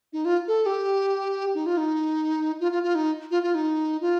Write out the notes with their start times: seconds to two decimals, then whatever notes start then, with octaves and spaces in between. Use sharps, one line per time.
0.13 D#4
0.25 F4
0.48 A4
0.66 G4
1.55 D#4
1.66 F4
1.77 D#4
2.60 F4
2.72 F4
2.83 F4
2.95 D#4
3.31 F4
3.43 F4
3.55 D#4
4.01 F4